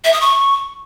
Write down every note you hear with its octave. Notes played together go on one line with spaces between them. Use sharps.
E5
D#6
C#6